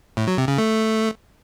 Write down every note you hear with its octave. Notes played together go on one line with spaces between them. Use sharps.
A2
F#3
C3
C#3
A3